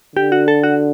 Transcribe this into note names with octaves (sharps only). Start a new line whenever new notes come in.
D3 G4
F#4
A4
F#4